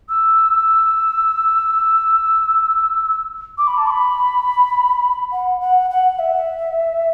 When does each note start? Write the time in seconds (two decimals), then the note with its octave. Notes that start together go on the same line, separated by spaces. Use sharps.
0.09 E6
3.58 D6
3.67 B5
3.78 A5
3.87 D6
3.90 B5
5.32 F#5
5.61 F#5
5.90 F#5
6.19 E5